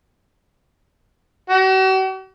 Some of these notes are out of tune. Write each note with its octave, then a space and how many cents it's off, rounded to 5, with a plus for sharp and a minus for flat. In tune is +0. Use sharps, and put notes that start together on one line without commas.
F#4 +45